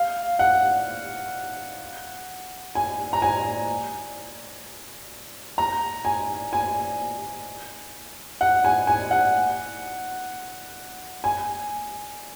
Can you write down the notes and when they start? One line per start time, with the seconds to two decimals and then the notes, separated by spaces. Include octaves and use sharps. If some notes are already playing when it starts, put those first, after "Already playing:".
Already playing: F5
0.39 F#5
2.75 G#5
3.13 A#5
3.22 G#5
5.58 A#5
6.05 G#5
6.53 G#5
8.41 F#5
8.65 G#5
8.87 G#5
9.11 F#5
11.24 G#5